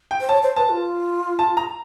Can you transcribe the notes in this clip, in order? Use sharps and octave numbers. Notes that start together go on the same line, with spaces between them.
G5
C5
C#5 A5
C5
B4 A5
F4
A5
A#5